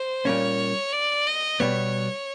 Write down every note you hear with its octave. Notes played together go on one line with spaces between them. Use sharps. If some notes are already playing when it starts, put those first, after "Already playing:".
Already playing: C5
A#2 G3 A#3 C#4 C#5
D5
D#5
B2 G3 B3 C#5